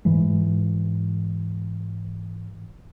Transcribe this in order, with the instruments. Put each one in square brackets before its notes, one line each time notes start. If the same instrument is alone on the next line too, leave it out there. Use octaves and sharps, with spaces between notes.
[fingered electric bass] G#2 E3 G#3